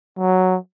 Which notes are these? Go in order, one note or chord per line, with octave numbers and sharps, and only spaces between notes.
F#3